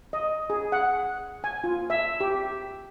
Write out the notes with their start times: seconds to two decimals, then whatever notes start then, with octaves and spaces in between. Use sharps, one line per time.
0.13 D#5
0.50 G#4
0.72 F#5
1.44 G#5
1.64 F4
1.90 E5
2.20 G4